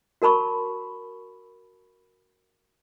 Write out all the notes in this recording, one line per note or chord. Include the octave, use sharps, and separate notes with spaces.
F#4 A#4 A5 B5 C#6